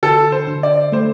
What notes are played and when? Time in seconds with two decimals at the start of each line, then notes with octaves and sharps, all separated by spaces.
0.03 D3 A4
0.32 C5
0.47 D3
0.63 D5
0.92 A3 C5